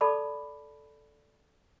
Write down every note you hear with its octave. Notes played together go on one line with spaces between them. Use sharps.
A4 D5 A5 B5 D6